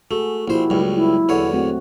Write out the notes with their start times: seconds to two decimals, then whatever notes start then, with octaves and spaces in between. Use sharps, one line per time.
0.11 A3 F#4 G#4
0.48 A#1 A#3 E4 F#4 G4 C5
0.70 C#2 G2 F#3
0.96 E4
1.29 E2 D3 C#5
1.53 A3 C4 F#4